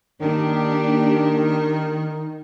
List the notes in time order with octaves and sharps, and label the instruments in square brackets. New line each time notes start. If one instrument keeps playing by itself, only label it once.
[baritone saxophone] D#3 [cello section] A#3 D4 G4